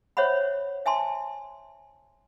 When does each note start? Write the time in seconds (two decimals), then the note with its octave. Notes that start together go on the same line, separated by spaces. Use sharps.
0.17 C5 C#5 E5 F#5 B5
0.86 E5 G#5 A5 C6